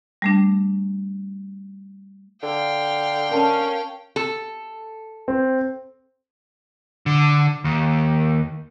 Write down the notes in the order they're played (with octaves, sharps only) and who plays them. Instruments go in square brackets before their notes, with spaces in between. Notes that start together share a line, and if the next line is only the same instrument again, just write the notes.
[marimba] G3 A3 D4
[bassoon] D3 [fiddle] F5 G5
[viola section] C#4 [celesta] A#4 A5
[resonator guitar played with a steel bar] A4
[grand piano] C4
[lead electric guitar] D3
D#2